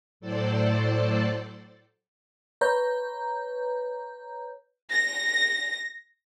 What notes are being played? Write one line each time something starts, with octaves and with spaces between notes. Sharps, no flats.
A2 F#3 A4 C5 D5 A5
B4 C#5 A#5 G6
A#6